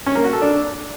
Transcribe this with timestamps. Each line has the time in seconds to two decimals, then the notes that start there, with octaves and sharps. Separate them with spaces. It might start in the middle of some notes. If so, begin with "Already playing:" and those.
0.06 C#4
0.15 A#3
0.24 F#4
0.33 A4
0.42 D4